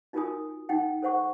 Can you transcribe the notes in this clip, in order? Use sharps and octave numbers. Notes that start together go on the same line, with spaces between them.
D#4 F4 F#4 A#4 G#5 D#6
D#4 F#5 G5
A4 C5 F#5 C#6